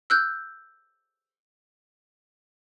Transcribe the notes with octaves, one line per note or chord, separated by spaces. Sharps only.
E6 F#6 G6